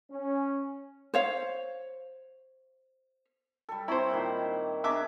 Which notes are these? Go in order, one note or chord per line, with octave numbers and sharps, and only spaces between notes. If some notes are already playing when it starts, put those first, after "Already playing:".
C#4
C5 C#5 F5
G3 A4
C4 E4 C5 C#5 A#5
A#2 D#3
D4 G#4 E5 A#5 D6